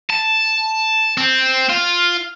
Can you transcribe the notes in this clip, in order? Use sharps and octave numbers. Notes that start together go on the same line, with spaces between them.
A5
C4
F4